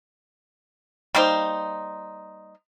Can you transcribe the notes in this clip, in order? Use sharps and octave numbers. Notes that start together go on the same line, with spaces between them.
G3 A#3 D#4 C5